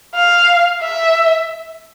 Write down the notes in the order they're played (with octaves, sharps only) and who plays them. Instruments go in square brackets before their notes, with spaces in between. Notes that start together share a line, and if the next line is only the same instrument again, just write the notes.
[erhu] F5
E5